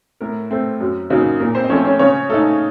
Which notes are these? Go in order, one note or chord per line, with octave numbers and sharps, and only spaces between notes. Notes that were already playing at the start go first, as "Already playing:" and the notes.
A2 A#4
A3 C4
F#2
C#3 F#3 A#3 D#4
A#2 A#4
C4 C5
D#5
F3 A3 C4 C#4 C#5
C#4 C#5
C#3 C#4 C#5
A3 D#4 A4